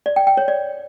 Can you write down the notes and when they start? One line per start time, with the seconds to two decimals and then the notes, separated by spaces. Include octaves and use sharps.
0.06 D5
0.16 G5
0.27 G5
0.37 C#5
0.48 D5